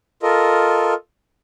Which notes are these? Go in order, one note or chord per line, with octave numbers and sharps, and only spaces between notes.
F4 A4 A#4 D#5